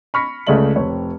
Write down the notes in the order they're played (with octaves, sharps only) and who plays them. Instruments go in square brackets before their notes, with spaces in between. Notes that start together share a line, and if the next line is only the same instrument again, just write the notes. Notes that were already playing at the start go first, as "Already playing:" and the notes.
[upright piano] B5 C#6 F6 A#6 B6 C#7
C#2 C#3 A3 D5 E5 F#7
F1 C4 C#5